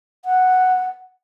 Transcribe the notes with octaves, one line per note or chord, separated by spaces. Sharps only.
F#5